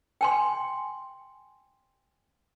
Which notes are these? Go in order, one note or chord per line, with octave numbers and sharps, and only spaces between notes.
G5 G#5 C6